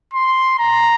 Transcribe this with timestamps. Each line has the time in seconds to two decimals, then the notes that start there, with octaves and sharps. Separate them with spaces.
0.14 C6
0.59 A#5